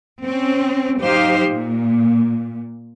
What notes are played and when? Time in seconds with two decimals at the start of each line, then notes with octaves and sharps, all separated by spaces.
0.24 C4 C#4
1.00 F#3 D#4 G4 C5 F5
1.47 A#2